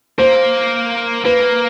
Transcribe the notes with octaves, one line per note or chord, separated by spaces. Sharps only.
A#3 C5
A#3 B4